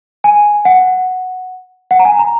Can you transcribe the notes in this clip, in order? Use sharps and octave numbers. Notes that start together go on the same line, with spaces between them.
G#5
F#5
F#5
A#5
G#5
A#5